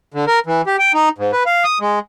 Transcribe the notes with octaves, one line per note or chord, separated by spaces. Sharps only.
D3
A#4
E3
G4
G5
D#4
G#2
B4
F5
D#6
G#3